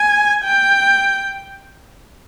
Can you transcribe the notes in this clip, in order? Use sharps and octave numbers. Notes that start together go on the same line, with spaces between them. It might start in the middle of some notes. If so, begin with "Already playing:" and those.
Already playing: G#5
G5